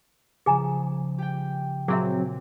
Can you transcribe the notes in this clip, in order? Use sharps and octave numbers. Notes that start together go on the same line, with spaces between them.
C#3 F3 G#4 G#5 A#5
G4 G5
A#2 F#3 C4 G#4 E5